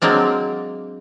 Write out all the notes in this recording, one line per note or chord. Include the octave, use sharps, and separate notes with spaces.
F#3 G#3 A#3 C4 D4